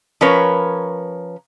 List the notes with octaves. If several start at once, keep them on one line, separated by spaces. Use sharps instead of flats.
F3 C#4 A#4 B4 C#5